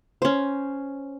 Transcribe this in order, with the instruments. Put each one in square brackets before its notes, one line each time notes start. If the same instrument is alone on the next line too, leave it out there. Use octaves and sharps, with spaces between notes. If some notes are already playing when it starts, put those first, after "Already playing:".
[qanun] C#4 C5